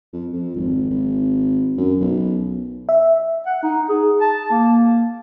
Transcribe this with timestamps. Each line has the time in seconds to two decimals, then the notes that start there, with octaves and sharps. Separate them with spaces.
0.13 F2
0.32 F2
0.56 G#1
0.90 G#1
1.77 F#2
2.01 B1
2.89 E5
3.46 F#5
3.63 D#4
3.89 G#4
4.21 A5
4.51 A#3